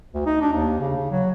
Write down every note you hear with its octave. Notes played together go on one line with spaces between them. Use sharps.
D2
D#4
D4
D#2
C#3
C#3
F#3